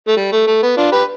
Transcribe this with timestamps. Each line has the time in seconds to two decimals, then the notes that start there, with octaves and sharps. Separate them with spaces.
0.08 A3
0.17 G3
0.32 A3
0.47 A3
0.62 B3
0.77 D4 F4
0.92 G4 B4